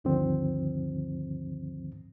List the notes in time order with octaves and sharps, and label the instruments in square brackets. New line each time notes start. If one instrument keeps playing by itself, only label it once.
[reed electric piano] D2 G2 D3 D#3 F3 C4